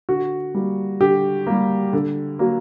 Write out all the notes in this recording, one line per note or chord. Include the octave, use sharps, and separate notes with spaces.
D3 F#4
G3 A#3
D3 G4
G3 A#3
D3
F#3 A#3